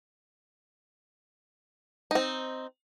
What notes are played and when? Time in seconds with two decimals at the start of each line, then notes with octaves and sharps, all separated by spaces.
2.11 C4 D#4